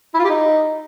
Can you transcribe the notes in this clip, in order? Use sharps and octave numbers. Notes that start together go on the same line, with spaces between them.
E4
F4
G4
D#4